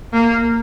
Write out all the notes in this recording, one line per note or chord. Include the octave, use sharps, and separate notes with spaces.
A#3